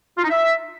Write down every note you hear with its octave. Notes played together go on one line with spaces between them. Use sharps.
F4
D#4
E5